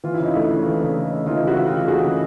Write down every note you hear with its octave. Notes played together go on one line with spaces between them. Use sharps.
E3 F4
E4
C#3
D#4
A3 D4 E4
C#3
E3
C#3
A3
C#3
E3 D#4 F4
C#3
E4 F#4
A3
F4 G4
C#3
E3 F#4 G#4
C#3